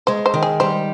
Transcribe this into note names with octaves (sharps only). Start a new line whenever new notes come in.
G#3 C5
C5
D#3
G#4
G3 C5